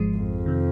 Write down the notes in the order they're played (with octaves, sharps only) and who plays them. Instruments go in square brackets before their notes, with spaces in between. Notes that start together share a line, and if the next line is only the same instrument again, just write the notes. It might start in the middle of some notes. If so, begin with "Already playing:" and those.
Already playing: [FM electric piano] G#1 G#2 F3 G#3
[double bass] F2
[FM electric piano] C3 D#3